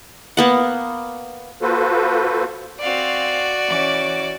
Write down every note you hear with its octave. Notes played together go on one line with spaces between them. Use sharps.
A#3 B3 F#5
A#3 F4 F#4 A4 B4 C5
C4 F#4 D5 F5
E3 C#4 D6